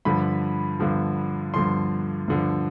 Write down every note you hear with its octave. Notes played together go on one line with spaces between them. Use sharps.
G2 D3 F3 B5
G2 D3 F3
G2 D3 F3 C6
G2 D3 F3